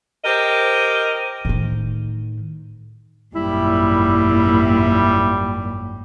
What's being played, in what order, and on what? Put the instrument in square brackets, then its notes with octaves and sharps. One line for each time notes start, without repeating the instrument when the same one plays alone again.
[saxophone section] G4 A#4 C5 D#5
[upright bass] A2 D#3
[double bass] G#1 F#2 [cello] A#2 [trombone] G3 [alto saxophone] E4